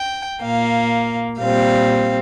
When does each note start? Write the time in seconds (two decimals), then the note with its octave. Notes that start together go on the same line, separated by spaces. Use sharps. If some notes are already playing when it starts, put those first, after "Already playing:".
Already playing: G5
0.41 A#2 A#3 F5
1.39 A#2 G3 C4 F5